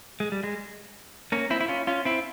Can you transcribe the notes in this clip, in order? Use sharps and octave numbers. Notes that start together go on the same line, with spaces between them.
G#3
G3
G#3
A#3 C#4
C4 E4
E4
C#4 F4
C#4 F4
C4 E4